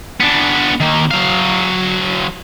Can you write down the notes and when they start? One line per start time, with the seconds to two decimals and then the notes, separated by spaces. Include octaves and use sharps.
0.20 B3 D4
0.80 D#3 A#3
1.11 F#3 F5